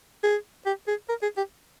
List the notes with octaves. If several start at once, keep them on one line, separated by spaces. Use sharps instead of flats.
G#4
G4
G#4
A#4
G#4
G4